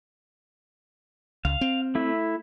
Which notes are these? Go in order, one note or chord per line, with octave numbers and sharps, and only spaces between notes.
C#2 F5
C4
A3 E4